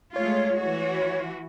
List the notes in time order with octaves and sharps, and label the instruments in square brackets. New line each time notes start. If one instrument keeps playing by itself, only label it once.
[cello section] G#3 A3 F4 [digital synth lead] C#5
[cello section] E3 F#4